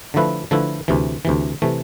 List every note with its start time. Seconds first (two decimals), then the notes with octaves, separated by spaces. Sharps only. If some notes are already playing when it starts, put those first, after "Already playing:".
0.14 D3 F3 A3 E4 B4
0.51 D3 F3 A3 E4 B4
0.88 D2 C3 E3
1.25 D2 C3 E3
1.62 C3 E3 A3